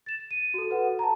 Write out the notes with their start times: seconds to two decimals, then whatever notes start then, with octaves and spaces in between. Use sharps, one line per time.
0.06 A6 E7
0.31 D#7
0.54 F#4 A4
0.70 F#4 B4 F#5
0.99 A5 A#5